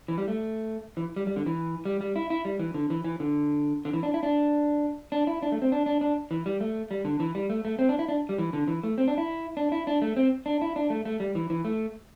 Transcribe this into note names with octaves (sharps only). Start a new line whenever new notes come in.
E3
G3
A3
E3
G3
G3
D3
E3
G3
G3
E4
E4
G3
E3
D3
E3
E3
D3
D3
E3
D4
E4
D4
D4
E4
D4
A3
C4
D4
D4
D4
E3
G3
A3
G3
D3
E3
G3
A3
A3
C4
D4
E4
D4
G3
E3
D3
E3
A3
C4
D4
E4
D4
E4
D4
A3
C4
D4
E4
D4
A3
A3
G3
E3
E3
A3